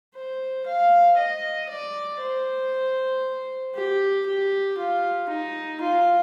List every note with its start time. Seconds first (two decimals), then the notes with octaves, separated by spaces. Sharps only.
0.15 C5
0.66 F5
1.17 D#5
1.69 D5
2.20 C5
3.75 G4
4.26 G4
4.77 F4
5.28 D#4
5.81 F4